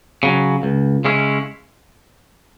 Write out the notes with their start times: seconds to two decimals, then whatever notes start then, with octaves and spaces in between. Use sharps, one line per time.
0.23 C#3 F#3
0.63 C#2
1.05 C#3 G#3 C#4 E4